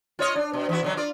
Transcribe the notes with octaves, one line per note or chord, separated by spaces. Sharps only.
F4 C#5 D#5
D4
B2
E3 E4 F#4
B2 D3 F#3
F4 D5